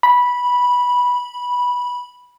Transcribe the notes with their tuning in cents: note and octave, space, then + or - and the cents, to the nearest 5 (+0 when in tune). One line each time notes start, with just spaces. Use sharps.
B5 -10